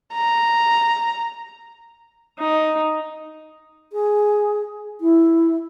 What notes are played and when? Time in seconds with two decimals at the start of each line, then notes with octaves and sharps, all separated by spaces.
0.13 A#5
2.38 D#4
3.92 G#4
5.00 E4